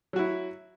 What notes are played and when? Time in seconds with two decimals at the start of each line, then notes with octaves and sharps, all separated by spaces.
0.13 F#3
0.16 F#4
0.19 E4